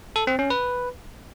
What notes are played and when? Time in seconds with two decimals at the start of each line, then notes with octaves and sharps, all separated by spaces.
0.16 A4
0.27 C4
0.39 C#4
0.50 B4